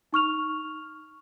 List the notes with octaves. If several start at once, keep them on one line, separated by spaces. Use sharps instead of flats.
D#4 C#6 F6 F7